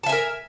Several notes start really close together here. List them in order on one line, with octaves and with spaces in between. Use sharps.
A5 E5 G#5 A#4